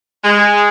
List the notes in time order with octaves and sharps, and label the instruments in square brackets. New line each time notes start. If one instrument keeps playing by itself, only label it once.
[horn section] G#3